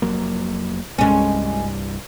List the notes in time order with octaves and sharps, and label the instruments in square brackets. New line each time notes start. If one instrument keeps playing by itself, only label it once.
[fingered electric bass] F1 F#3 A#3
[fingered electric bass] C2 G2 [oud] G#3 C#4